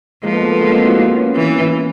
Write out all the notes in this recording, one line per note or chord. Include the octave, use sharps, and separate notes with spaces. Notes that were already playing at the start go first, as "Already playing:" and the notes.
F3 G#3 A#3
A3 B3
A3 B3
G#3 A#3
A#3 C4
E4 F#4
A#3 C4
B3 C#4
E3